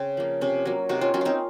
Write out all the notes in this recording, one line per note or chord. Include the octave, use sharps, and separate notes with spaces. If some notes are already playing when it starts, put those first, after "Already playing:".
Already playing: C#3 C4
F3 A#3
C3 C#4
F#3 A#3
C3 D#4 F#4
C#4 F4
F#3 A#3 C#4
C4 D#4 F4